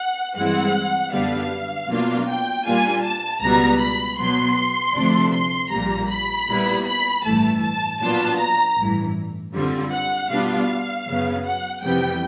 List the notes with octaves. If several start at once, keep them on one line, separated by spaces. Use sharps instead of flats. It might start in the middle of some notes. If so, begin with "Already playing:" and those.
Already playing: F#5
G2 E3 G#3 C4 E4 F#5
F#2 D3 G3 B3 D4 F5
B2 F#3 A#3 D4 F4
G5
A#2 G3 A#3 D4 F4 G#5
A5
C#2 B2 G3 B3 A#5
B5
B2 F#3 B3 C6
D2 C3 F3 A3 D4
C6
A#1 A#2 G3 A#3 A#5
B5
A#2 G3 B3 E4
B5
A1 G2 E3 A3 A5
A5
A#2 F#3 B3 D4 F4 A5
A#5
A1 G2 E3
F#2 D3 G3 C4 F4
F#5
B2 G3 B3 D4 F4 F5
F#2 C#3 F#3 B3
F#5
F2 C3 E3 G3 B3 G5